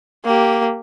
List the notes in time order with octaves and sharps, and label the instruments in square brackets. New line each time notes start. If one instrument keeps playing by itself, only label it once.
[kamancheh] A#3 G4